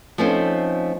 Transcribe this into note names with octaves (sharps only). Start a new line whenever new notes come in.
F3 A3 C4 C#4 D#4 C5